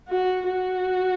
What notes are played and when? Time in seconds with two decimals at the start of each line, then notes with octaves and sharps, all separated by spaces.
0.09 F#4
0.49 F#4